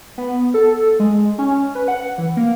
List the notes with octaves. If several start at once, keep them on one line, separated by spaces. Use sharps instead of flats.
B3
A4
G#3
C#4
B4
F#5
E3
A#3